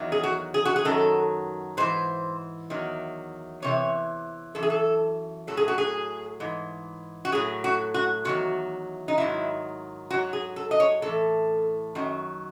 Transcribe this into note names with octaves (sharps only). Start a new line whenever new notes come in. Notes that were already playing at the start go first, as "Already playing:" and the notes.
Already playing: E2 D#3 F#3
G#4
F#4
G#4
F#4
G#4
F#2 D#3 F#3 A4
G#2 E3 C5
E2 D#3 F#3
E2 C3 E3 C#5
F#2 E3 A4
G#4
A4
A2 F#3 A4
G#4
F#4
G#4
G#2 E3
F#4
A2 F#3 G#4
F#4
F#4
E2 D#3 F#3 F#4
D#4
G#2 D#3 F#3 E4
G#2 F#3 F#4
G#4
A4
D#5
C#5
A2 E3 A4
F#2 D#3 F#3